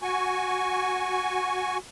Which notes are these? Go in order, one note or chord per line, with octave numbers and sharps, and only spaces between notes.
F#4 G#5 C#6